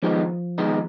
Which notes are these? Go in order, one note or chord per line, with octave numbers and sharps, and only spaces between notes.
D#3 F3 G#3 B3 D#4
D#3 G#3 B3 D#4